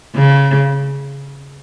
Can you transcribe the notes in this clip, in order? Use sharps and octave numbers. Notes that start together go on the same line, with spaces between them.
C#3